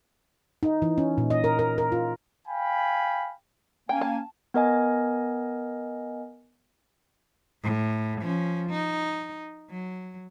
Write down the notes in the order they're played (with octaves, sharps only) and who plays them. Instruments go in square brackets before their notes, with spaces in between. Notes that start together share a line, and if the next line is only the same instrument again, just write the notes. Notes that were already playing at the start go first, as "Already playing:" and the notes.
[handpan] D#4
E3
C#4
A#2
D#5
A#4
A#4
A#4
F4
[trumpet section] F5 G5 G#5 B5
[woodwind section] A#3 C#4 G#5 [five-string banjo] G5
[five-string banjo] A5
[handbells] B3 A#4 D#5 G#5
[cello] A2
F3 C#4
D#4
F#3